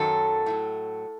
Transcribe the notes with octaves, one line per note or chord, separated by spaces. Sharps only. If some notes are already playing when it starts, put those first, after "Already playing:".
Already playing: F#2 D#3 F#3 A4
A2 F#3